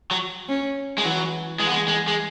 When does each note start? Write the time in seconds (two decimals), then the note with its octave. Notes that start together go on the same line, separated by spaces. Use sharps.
0.11 F#3
0.48 C#4
0.98 G#3
1.04 E3 F#3
1.59 E3 G#3
1.67 B3
1.74 G#3
1.88 G#3
2.07 G#3